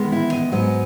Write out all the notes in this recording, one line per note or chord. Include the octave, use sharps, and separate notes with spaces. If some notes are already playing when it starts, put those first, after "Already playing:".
Already playing: E2 D#3 G#3 B3
E4
D#5
G#2 F#3 B3 D#5